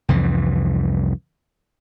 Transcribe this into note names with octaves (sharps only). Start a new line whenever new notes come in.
C2 F2 E3